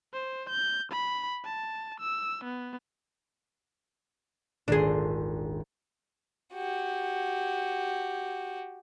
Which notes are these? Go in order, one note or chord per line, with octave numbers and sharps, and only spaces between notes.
C5
G6
B5
A5
E6
B3
D#1 G#1 D4 G#4 C6
F#4 G4